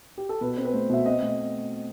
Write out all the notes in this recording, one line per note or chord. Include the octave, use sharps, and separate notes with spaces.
G4
A4
B2 B4
C4
B4
A3 C5
B2 E5
C4 D#5
A3